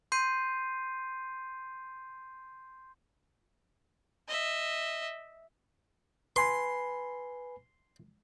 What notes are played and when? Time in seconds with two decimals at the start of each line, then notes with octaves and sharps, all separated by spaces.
0.12 C6 G6 C7 D#7
4.28 D#5 E5
6.36 B4 G#5 B5 C6